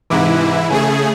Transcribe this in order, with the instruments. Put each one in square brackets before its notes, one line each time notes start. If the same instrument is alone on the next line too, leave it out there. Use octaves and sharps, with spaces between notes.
[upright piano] G#2 C3 D6 [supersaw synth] E3 E4
[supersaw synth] C#3 A3 G#4 [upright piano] G#5